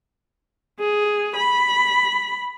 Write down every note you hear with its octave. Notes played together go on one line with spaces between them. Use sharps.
G#4
B5